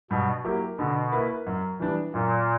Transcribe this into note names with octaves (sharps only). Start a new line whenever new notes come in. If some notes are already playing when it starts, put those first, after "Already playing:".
G2 B2
F#3 A#3 E4 G4
B2 D3
A#3 E4 B4
F#2
E3 G3 B3 D4
F#2 A#2